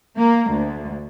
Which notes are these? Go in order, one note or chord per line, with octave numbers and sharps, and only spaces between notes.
A#3
D2